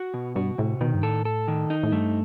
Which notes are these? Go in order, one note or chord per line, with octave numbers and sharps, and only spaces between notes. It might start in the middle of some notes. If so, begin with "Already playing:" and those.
Already playing: F#4
B2
G2 F#4
A2 C3
B2 D#3
G2
A2 A4
A4
D#3
D#4
A2
G2 A3